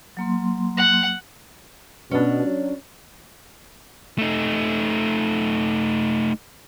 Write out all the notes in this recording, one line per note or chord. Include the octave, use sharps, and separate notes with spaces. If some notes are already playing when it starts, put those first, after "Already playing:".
F#3 A#3 C6
F#5
B2 C#4 D4
F#3
A3 D#4